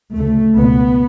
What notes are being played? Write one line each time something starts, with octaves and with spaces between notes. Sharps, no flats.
D2 C#3 A3
C#2 B2 B3